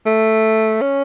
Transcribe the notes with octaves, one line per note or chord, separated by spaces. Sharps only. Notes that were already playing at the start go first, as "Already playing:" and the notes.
A3
C#4